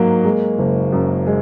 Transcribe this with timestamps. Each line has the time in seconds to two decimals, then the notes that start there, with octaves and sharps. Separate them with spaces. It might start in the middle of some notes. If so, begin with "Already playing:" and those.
Already playing: G#2 F#3 A#3
0.24 G#3
0.59 F#1
0.92 F#2
1.27 G#3